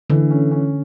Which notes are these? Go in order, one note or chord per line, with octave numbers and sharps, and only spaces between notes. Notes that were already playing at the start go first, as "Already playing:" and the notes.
D3 E3
C#4
C#4